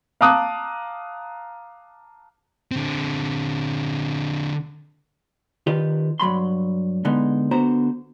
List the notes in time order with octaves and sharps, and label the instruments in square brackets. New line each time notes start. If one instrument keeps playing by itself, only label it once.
[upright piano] F5 A5 A#5 D6 D#6 F#6
[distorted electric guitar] D3 C4
[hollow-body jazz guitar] D#3 F4 G4 B4
G2 F#3 B5 C6
D3 G#3 B3 D#4
D3 B3 F#4 C5 A#5